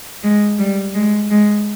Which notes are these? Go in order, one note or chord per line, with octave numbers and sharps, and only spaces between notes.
G#3
G3
G#3
G#3